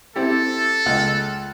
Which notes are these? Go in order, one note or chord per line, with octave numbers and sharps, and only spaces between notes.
C4 E4 G4 A4
C#2 D#5